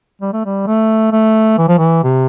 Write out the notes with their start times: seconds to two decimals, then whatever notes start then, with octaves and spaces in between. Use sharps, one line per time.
0.22 G3
0.33 A3
0.46 G3
0.67 A3
1.12 A3
1.58 E3
1.69 F3
1.78 E3
2.04 C3